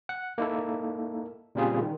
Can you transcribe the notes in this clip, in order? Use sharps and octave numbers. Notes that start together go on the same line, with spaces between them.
F#5
A#3 D#4 E4 A4
A#2 C#3 G3 C4 F4 G#4
D#3